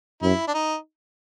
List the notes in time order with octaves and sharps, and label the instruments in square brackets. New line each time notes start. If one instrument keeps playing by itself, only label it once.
[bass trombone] F#2 [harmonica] E4
[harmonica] D4
D#4